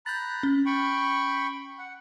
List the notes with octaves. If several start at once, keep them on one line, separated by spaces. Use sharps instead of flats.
A#5 B5 F#6 G6 A6
C#4
G5 B5 C#6
F#5